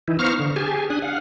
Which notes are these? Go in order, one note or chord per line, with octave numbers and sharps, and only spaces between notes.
E3 D#4 E4
B3 C5 F5 A#5 C#6 F6
D3
G4 G#4 G#5 A5
D4 G#5 D#6 F#6
F5 F#5